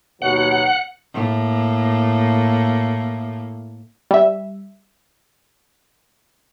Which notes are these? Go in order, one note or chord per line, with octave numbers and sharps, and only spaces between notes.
D#2 B2 F#3 F#5
A2 A#3
G3 E5